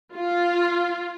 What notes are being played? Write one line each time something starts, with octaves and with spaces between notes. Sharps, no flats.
F4